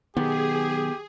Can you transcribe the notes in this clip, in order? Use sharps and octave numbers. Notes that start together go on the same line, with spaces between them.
B1 D#3 B3 G4 G#4